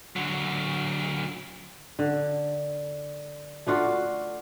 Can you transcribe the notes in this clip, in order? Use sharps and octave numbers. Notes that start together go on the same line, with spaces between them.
D3 F#3
D3
A3 D4 F4 F#4